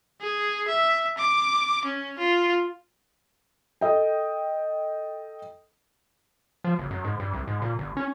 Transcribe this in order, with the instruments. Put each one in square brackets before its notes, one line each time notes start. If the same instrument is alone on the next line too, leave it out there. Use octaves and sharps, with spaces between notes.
[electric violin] G#4
E5
D6
C#4
F4
[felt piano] A4 D#5 G5
[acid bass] F3
F#1
F#2
G#2
G2
C2
G#2
A#2
G1
C#4